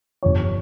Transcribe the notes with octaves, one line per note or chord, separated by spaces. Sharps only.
G1 G2 F3 C#5